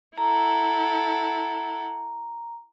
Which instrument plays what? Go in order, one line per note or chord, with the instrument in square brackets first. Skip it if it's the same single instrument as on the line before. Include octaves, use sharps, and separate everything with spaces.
[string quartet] E4 A4 F#5 [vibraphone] A#5